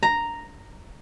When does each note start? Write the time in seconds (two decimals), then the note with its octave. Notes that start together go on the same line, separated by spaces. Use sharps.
0.03 A#5